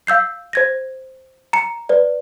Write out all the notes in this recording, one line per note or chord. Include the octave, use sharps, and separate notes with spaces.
F5 E6 G6 C7
C5 G#6 A#6
A#5 C#7
B4 D5